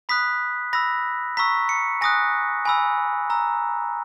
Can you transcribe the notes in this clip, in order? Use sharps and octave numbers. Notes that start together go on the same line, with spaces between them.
B5 D#6 F#6 B6
B5 E6 A#6
A#5 C#6 E6 B6
C#7
G#5 D#6 F#6 A#6
G#5 B5 E6
A#5 E6